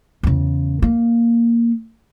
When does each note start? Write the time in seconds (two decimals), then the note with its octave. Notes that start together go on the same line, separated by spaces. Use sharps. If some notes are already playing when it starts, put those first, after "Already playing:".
0.23 E2 C#3
0.82 A#3